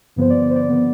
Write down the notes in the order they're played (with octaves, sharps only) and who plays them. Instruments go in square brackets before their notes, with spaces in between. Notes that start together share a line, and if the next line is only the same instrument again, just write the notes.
[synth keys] G2 D3 F3 B3 C5
D5
D5
C5
D5
D3 F3 B3